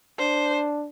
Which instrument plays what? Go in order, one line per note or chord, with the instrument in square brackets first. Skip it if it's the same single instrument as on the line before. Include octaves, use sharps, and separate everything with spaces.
[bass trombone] D4 [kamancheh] C5